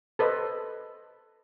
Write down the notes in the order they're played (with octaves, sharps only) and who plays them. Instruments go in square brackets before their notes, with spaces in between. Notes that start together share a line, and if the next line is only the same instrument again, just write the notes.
[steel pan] A4 B4 C5 D#5